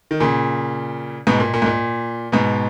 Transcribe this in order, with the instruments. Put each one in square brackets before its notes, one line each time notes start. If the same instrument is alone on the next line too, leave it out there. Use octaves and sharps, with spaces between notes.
[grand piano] D#3
A#2 C#3
G#2 B2
A#2
A#2
G#2
A#2
G#2 B2